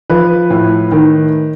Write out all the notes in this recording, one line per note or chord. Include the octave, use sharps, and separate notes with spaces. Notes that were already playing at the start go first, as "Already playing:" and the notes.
F3 B4
A2
D#3